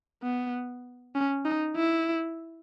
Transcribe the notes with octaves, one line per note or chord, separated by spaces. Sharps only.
B3
C#4
D#4
E4